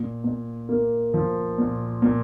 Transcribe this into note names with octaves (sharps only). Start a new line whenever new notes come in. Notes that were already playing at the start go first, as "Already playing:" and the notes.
Already playing: A#2
A#2
A#3
F3
A#2
A#2